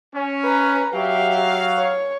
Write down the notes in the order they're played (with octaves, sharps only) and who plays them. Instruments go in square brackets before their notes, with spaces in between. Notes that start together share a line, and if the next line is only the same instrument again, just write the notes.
[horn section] C#4
[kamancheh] B4 A#5
[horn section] F#3 F5 [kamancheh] G4 E5
[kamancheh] C#5